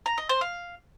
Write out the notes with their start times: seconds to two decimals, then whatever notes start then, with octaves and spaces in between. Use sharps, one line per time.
0.06 A#5
0.18 D#5
0.29 C5
0.41 F5